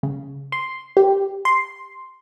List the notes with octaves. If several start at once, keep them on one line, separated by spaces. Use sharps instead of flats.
C#3
C6
G4
C6